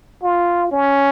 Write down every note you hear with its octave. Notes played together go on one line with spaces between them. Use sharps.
F4
C#4